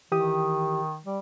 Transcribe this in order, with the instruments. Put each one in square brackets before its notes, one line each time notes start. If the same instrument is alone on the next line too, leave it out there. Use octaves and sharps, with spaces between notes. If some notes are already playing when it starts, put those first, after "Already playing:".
[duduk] D#3 [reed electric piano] E3 G4 D#6
[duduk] G3